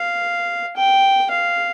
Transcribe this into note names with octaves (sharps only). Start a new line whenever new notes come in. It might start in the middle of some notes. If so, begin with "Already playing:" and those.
Already playing: F5
G5
F5